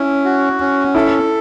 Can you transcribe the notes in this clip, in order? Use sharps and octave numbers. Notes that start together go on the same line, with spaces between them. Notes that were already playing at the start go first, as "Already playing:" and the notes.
Already playing: C#4 E4
F#4
C#4
E4 A4